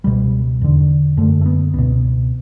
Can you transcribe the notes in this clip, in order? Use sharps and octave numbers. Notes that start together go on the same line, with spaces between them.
C#2 B2 G3
E2 D3
F#2 D3 A3
A3
B3
C#2 B2 B3